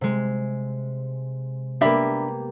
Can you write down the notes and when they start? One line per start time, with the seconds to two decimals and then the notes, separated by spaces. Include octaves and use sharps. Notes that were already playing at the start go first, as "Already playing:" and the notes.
0.01 C3 G#3
1.81 A#3 B3 D4 G4 E5 B5